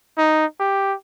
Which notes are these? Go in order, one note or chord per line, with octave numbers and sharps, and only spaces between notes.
D#4
G4